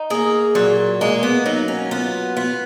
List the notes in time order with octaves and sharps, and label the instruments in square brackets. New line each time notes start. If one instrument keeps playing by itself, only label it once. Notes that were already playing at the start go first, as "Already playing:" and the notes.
Already playing: [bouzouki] D#4
[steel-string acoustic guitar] A#3 [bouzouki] G#4
[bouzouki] A#2 [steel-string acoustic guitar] F#3
[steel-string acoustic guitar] G#3 [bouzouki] A#3
[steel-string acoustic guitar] B3
[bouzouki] F#3 [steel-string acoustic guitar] D#4
[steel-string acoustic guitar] C#4
[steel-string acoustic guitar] B3 [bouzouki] F4
[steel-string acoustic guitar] B3 [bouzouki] F4